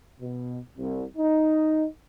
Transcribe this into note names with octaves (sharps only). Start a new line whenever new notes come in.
B2
C2
D#4